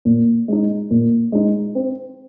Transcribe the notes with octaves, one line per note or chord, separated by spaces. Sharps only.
A#2
G#3 D#4
A#2
G#3 D#4
C4